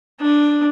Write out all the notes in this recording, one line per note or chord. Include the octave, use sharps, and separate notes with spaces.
D4